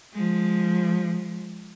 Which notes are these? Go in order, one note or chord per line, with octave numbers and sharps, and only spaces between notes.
F3 G#3